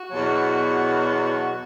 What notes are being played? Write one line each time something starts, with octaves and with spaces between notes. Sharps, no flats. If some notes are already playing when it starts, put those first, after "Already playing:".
Already playing: F#4
E2 B2 F#3